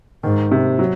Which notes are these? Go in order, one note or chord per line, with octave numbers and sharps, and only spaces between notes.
G#2 D#3
C3
F#3